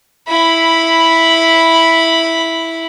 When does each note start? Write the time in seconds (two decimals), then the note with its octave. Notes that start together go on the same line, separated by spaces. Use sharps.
0.28 E4 B5